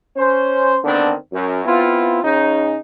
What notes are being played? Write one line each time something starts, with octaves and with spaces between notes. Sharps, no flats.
C#4 C5
D3 D#3 B3 C4 D4
F#2
B3 C4 E4 F4
C#3 C#4 D#4